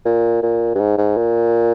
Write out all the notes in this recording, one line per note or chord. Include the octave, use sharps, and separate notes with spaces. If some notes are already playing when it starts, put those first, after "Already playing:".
A#2
A#2
G2
G#2
G#2
A#2